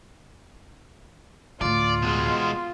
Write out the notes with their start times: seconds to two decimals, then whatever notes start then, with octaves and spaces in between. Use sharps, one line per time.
1.61 D2 A2 F4 D5
2.02 B2 G#3